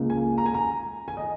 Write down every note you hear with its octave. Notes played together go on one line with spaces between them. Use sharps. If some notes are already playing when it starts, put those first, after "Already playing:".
Already playing: C#2 C#3 A#3
G#5
A#5
G#5
A#5
G#5
D#5